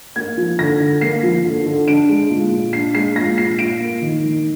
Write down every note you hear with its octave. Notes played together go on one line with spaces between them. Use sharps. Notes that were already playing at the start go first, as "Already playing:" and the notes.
A#3 G#6
F3
D3 A#6
D3
A#3 C7
F3
D3
D3
D4 D7
G#3
A#2
A#2
D4 C7
G#3 C7
A#2 A#6
A#2 C7
F4 D7
A#3
D#3
D#3